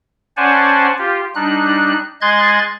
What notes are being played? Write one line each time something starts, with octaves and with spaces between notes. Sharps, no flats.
C#4 C5 D5 F#5 G#5 A5
F4 G4
G3 D4 D#4 F#6
G#3 D#5 C6 F#6 G#6 A6